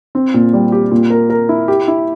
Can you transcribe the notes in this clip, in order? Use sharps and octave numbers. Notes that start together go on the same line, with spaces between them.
C4
A#2
G3
G4
A#2
A#4
A#4
E4
G4
E4